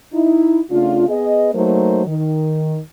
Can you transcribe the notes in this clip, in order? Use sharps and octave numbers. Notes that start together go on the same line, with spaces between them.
D#4 E4
C#3 A3 D4 F4
B3 G#4 D#5
F#3 A3 A#3 D#4 A#4 C5
D#3